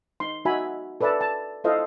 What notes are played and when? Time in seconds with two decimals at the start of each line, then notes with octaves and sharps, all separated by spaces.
0.20 D#4 C6
0.45 D#4 F#4 E5 G#5 B5
1.01 A4 B4 D5 E5 A5
1.21 A5
1.64 E4 F4 A4 C5 D#5 F5